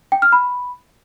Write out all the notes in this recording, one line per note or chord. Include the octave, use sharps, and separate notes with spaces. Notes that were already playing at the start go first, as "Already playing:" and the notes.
G5
F6
B5